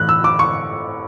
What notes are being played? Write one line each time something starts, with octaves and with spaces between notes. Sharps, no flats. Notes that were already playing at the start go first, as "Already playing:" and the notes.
Already playing: A2 E3 F#6
E6
D6
C#6